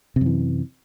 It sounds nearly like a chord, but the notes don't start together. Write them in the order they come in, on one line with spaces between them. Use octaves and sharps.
C3 F#2 E3